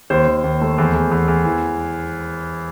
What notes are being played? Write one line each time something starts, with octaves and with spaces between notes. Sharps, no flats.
D#2 C5
D#2
D#2
A3
E2
E2
E2
E2
E3